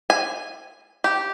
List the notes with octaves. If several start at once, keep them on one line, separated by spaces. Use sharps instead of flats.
G#5
G4